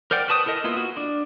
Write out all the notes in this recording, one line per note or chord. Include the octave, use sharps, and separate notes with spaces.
A#4 C5 D5 F#5 G5
F#4 B4 A5 D6 D#6
E4 A4 A#4 D#5
A#3 B3 E4 F4
F#4
D4